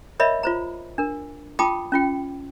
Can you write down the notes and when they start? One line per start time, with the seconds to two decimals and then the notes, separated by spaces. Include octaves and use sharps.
0.20 A#4 C#5 D#5 E5 B5
0.43 F4 C5 A#5
0.98 D4 A#4
1.59 F4 G5 A5 B5 D6 D#6
1.92 C#4 F4 G5